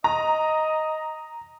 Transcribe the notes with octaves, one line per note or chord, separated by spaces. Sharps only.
D#5 A#5